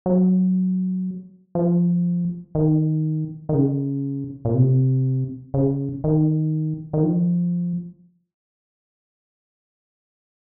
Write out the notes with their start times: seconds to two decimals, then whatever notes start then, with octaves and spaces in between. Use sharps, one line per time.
0.06 F#3
1.55 F3
2.55 D#3
3.49 D#3
3.54 C#3
4.45 A#2
4.55 C3
5.54 C#3
6.04 D#3
6.93 D#3
7.03 F3